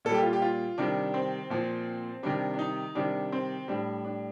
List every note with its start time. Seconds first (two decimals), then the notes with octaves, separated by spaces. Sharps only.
0.05 A#2 G3 A4
0.14 G4
0.23 F4
0.33 G4
0.42 F4
0.78 C3 D#3 G3 D4
1.14 C4
1.50 A#2 F3
2.23 C3 D#3 G3 D4
2.54 D4
2.59 D#4
2.95 C3 D#3 G3 D4
3.32 C4
3.68 A2 G3 D4
4.05 D4